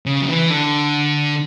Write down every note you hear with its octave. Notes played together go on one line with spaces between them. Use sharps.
C#3
F#3
E3
D3